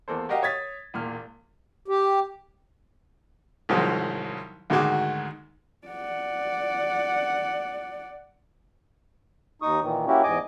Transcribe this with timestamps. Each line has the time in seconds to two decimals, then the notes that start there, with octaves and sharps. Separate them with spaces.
0.08 E2 A#3 A4 C5
0.29 F#4 G4 A#4 D#5 F5 F#5
0.43 C#5 D#6 G#6 A6 B6
0.94 E1 A#2 F6
1.88 G4
3.69 C2 G#2 D#3 F3 F#3 G#3
4.70 D2 G#2 D#3 G#3 F#4 D6
5.87 D5 F#5
9.62 D#2 D#4 C#6 D#6
9.82 A#2 D#3 E3
10.07 A#3 C#4 E4 F#4 G4
10.23 E2 G#2 D#5 G#5 D6